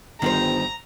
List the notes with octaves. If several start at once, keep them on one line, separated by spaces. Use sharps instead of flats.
G1 D#3 G3 C5 A#5